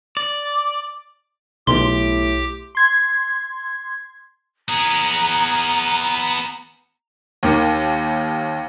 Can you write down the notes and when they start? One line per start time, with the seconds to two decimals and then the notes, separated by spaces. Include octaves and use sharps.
0.17 D5
1.67 B1 A2 G4 C6 D6
2.75 C6 G#6
4.69 B3 G#4 A#5
7.43 D#2 D#3